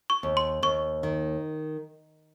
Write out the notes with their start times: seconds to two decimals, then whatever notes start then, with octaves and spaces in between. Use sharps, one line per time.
0.10 C#6
0.23 D#2
0.37 C6
0.63 D#2 C#6
1.03 D#3